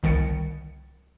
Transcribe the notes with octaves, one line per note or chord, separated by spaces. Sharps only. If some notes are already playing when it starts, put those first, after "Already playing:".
G1 C2 D#3 A6 C#7